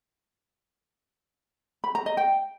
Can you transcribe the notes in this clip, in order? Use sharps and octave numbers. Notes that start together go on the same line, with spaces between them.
B5
A#5
D#5
G5